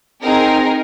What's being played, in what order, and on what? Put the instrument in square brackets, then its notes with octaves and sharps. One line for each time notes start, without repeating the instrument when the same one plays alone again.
[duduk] C4 [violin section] D#4 G#4 A#4